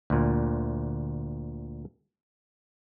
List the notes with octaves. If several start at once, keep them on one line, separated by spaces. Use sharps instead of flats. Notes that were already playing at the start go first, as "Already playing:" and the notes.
D2 A#2